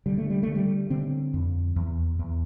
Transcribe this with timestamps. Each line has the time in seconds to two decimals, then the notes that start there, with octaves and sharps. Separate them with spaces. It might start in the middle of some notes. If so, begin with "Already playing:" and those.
0.06 D3 G3
0.18 A3
0.30 G3
0.43 D3 A3
0.55 G3
0.90 D3 C4
1.34 F2
1.76 E2
2.19 E2